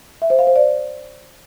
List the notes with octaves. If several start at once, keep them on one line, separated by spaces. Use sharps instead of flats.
E5
C5
F5
C5
D5